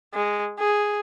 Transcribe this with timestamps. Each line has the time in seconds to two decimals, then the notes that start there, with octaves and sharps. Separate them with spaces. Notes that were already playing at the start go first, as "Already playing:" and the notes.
0.14 G#3
0.59 G#4